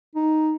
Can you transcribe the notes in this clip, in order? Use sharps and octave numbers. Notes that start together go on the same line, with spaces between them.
D#4